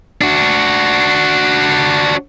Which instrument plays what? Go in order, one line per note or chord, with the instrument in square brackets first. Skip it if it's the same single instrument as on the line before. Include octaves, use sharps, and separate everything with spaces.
[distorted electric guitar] D4 F#4